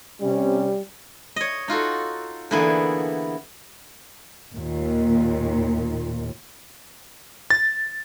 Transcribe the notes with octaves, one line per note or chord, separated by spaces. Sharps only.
C3 G3 C#4
C#5 D#5
D#4 F4 F#4 A4
D3 E3 A#3 B3 E4 G#4
D#2 A#2
A6